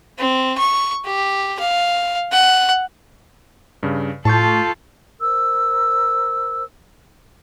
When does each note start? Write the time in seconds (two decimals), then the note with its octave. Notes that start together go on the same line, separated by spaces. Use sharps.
0.18 C4
0.58 C#6
1.05 G4
1.59 F5
2.32 F#5
3.83 G2 C#3
4.25 A2 F4 A4 A5 C#6 G6
5.20 A#4 C5 E6